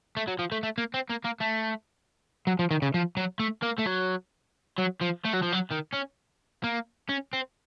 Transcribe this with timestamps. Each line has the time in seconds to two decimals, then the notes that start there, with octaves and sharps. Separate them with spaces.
0.17 A3
0.28 F#3
0.39 F3
0.52 A3
0.63 A3
0.78 A#3
0.94 C4
1.10 A#3
1.24 A#3
1.40 A3
2.47 F#3
2.59 F3
2.71 D#3
2.82 C#3
2.94 F3
3.17 F#3
3.40 A3
3.63 A#3
3.79 A3
3.87 F#3
4.78 F#3
5.01 F3
5.25 A3
5.34 F#3
5.43 F3
5.53 F#3
5.71 D#3
5.94 C#4
6.64 A#3
7.09 C#4
7.33 C4